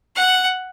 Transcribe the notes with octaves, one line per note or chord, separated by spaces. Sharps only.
F#5